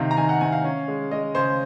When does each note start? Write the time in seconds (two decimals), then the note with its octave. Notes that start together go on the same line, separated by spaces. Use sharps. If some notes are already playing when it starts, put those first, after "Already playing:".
Already playing: C3 D#3 F5
0.11 A#5
0.17 D#3 G#5
0.29 F#5
0.41 C3 G#5
0.52 F5
0.64 C#4
0.88 G#3
1.11 G#3 D#5
1.35 C#3 C5